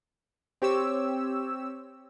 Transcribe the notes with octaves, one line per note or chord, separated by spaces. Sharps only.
C4 G4 C#5 E6